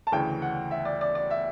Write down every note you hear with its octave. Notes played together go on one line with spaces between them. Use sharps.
A5
D2 C#3 E3 G5
F#5
E5
D5
D5
D5
E5